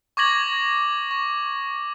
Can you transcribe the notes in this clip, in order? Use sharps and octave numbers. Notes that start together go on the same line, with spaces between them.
C#6 D6 G#6 A#6 F#7
C#6